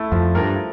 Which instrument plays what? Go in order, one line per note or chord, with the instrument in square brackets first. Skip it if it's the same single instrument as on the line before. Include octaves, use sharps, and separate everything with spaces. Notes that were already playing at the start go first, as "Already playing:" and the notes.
Already playing: [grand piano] A3 E4
[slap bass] F2 [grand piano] F3
[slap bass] G2 [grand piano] A#4